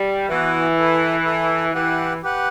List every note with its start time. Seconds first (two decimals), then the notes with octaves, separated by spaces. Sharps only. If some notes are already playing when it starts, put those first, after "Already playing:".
Already playing: G3
0.29 E3 B3 F#4 B4
0.77 E4 A4 E5
1.25 E4 A4 E5
1.74 E3 G4 B4 F#5
2.23 G4 B4 F#5